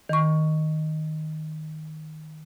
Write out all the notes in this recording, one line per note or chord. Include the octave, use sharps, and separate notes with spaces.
D#3 C#6